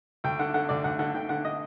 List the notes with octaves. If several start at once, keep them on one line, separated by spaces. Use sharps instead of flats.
D2 G5
D3 F#5
D3 F#5
D2 D5
D2 F#5
D3 F#5
D3 G5
D3 F#5
D#5